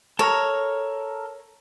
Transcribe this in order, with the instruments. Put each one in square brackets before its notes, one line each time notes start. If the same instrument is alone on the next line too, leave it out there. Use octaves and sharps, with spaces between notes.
[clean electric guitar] A4 A#4 A#5 [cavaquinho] C#5